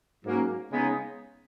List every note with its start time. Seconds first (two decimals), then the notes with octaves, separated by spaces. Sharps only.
0.24 G#2 F#3 A#3 C#4
0.71 C#3 G#3 B3 D#4